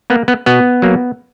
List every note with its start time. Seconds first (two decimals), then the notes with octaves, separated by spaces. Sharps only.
0.10 A#3 B3
0.28 B3
0.46 B2 B3
0.82 F#3 A#3